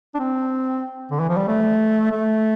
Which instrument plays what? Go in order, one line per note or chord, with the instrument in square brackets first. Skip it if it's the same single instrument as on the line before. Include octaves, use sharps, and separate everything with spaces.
[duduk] D4
C4
D3
E3
F3
G3
A3
A3